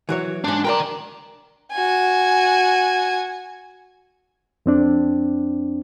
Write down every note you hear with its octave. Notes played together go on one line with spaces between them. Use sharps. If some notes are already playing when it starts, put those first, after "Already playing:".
E3 F#3 C#5
G#2 C#4 D4
A#4 B4 D5 G5 A#5
F#4 G#5
F2 C4 D4